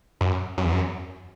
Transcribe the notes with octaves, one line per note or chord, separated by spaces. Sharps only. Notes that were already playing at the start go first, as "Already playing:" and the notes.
F#2
F#2
E2
F#2